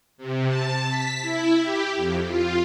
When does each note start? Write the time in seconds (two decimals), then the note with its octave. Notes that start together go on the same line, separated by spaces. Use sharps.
0.18 C3
0.47 A5
0.88 B6
1.22 E4
1.61 G4
1.96 F2
2.25 F4